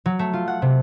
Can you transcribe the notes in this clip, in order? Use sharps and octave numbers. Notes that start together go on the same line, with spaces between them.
F#3
A3
F4
F#5
C3